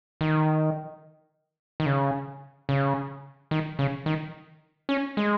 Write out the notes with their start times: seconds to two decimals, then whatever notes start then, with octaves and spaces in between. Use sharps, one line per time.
0.21 D#3
1.80 D#3
1.86 C#3
2.69 C#3
3.51 D#3
3.79 C#3
4.06 D#3
4.89 C#4
5.17 G#3